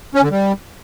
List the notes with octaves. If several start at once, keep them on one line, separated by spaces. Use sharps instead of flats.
C#4
D3
G3